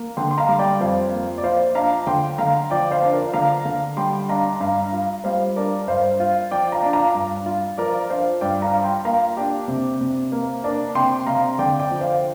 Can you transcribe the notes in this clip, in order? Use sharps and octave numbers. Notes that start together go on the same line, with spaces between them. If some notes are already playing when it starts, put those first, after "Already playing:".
Already playing: A#3
D3 G5 C6
C6
F5 A#5
G3
D5 G5
F2 C5 F5
A#3
D5
F3 C5 F5
D4 F5 A#5
D3 G5 C6
D3 F5 A#5
F3 D5 G5
C5 F5
D4
A#4 D5
D3 F5 A#5
D3
G3 G5 C6
D4 F5 A#5
G2 F5 A#5
F4
G3 C5 F5
D4 A#4 D5
G2 C5 F5
F4
F3 D5 G5
F5 A#5
D4
F5 A#5
G2
F4
F3 A#4 D5
D4 C5 F5
G2 D5 G5
F5 A#5
F4
G5 C6
A#3 F5 A#5
D4 G4
C3
C3
A#3
D4 A#4 D5
C3 G5 C6
C3 F5 A#5
D3 D5 G5
D5 G5
F3
C5 F5